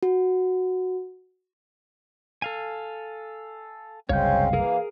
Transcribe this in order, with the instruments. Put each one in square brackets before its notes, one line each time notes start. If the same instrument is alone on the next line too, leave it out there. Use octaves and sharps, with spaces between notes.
[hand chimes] F#4
[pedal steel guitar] A4 F5 G#5
[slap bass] F#1 C2 [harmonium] G#3 C4 C#4 [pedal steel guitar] C#5 G6 [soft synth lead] F5
[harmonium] E3 A#3 [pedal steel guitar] G#4 A#4